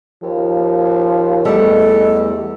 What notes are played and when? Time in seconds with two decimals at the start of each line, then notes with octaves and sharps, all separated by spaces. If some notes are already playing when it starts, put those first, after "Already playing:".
0.22 D#2 F3
1.45 E2 G3 A3 A4 D#5